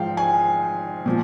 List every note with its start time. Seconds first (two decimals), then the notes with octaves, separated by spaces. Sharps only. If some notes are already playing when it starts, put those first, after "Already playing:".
Already playing: G#2 F3 F5 G5
0.17 G#5
1.06 A#2 F3